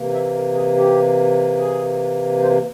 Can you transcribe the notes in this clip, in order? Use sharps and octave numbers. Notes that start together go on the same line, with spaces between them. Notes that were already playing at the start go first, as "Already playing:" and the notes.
Already playing: C3 E3 A#3
E5
A#4
G#4
G4
G#4
C5